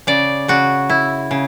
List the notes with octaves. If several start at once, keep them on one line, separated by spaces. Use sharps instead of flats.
C#3 D5
C#3 F#4
E4
C#3